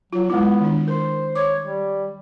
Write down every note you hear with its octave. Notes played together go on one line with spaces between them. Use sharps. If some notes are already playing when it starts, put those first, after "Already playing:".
F#3 F4
G#3 B3 E4
D#3 D4
A#4 C5
C#5 D6
G3